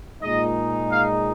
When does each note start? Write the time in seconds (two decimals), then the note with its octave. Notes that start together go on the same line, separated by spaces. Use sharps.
0.22 A#2 G#3 D#4 D#5
0.92 F5